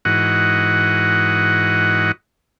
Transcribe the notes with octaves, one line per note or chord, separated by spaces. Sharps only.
G#2 E3 F#4 D#5 F#5